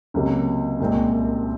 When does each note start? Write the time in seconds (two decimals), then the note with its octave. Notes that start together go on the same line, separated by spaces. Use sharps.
0.14 C#2 C3 F#3 A#3
0.80 C2 A#2 G#3 C4